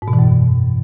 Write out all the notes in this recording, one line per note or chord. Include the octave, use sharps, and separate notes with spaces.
G#2
B2
E3
F#2